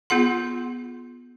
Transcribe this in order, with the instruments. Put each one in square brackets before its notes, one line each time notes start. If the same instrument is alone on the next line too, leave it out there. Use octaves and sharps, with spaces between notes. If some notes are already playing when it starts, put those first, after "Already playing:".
[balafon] B3 F4 G#4 F#5 C6